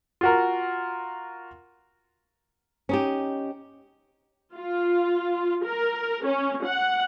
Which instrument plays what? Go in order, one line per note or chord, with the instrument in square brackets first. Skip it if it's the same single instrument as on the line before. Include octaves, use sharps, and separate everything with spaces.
[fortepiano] F4 F#4 A#4
[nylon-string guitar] C#4 D#4 G4
[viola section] F4
A#4
C#4
F#5